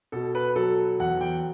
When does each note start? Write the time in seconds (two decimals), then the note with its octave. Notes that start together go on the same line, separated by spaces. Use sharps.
0.12 B2 A4
0.35 B4
0.56 F#3 A4
0.99 E2 F#5
1.21 G5